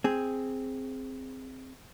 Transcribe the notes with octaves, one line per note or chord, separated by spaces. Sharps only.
C4 G#4